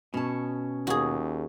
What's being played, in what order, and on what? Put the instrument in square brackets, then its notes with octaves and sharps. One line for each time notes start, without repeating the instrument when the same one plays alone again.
[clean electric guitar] B2 [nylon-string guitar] C#4 A5
[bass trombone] D#2 [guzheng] F#4 G#4